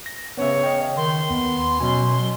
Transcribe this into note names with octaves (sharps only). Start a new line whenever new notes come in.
A#6
C#3 B3 C#4 C#5 E5
D#5 G5
D#3 C6
D#2 B3
B2 F#3 C#4 G#5